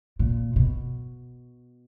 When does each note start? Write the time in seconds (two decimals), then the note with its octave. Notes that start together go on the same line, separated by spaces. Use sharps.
0.19 A#2
0.56 B2